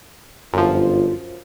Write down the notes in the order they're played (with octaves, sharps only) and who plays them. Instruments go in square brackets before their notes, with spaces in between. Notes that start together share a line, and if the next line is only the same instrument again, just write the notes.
[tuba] G1 [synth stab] F#2 F3 [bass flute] F4